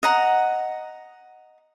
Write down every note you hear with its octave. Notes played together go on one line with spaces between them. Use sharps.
D#5 F#5 A#5